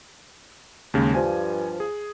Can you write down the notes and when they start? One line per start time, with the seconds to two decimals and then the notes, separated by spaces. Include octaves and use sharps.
0.94 D#2 C#3 G#3
1.14 G2 F3 G#5
1.80 G#4